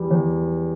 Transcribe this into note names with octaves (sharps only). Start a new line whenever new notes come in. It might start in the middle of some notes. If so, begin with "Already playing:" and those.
Already playing: E2 G3
E2